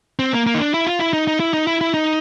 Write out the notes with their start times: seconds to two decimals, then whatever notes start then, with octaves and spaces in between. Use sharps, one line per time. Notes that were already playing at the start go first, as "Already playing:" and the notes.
0.19 C4
0.33 A#3
0.46 A#3
0.54 D#4
0.60 D4
0.74 E4
0.87 F4
1.00 E4
1.13 D#4
1.27 D#4
1.40 E4
1.54 D#4
1.67 E4
1.81 E4
1.94 D#4